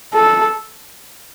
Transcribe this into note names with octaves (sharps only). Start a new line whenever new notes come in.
A4